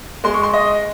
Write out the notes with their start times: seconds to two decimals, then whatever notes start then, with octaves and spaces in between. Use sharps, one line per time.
0.24 G#3 C6
0.34 C#6
0.43 C6
0.53 D#5